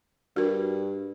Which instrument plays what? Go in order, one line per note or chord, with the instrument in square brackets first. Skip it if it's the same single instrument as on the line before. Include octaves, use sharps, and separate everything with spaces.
[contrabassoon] G2 [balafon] F#4 A#4